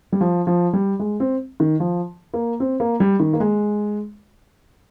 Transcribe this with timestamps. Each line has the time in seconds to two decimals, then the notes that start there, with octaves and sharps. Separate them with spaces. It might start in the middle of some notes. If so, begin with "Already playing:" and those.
0.12 G3
0.21 F3
0.47 F3
0.73 G3
0.99 G#3
1.20 C4
1.60 D#3
1.80 F3
2.34 A#3
2.60 C4
2.80 A#3
3.00 G3
3.20 D#3
3.33 A#3
3.40 G#3